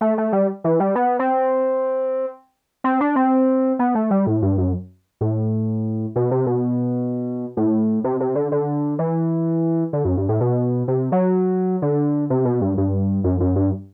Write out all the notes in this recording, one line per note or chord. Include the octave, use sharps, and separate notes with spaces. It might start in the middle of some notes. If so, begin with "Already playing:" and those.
A3
A3
G3
E3
G3
B3
C4
C4
D4
C4
B3
A3
G3
A2
G2
F#2
A2
B2
C3
B2
A2
C3
C3
D3
D3
E3
D3
F#2
G2
A2
B2
C3
F#3
D3
C3
B2
G2
G2
F#2
F#2
G2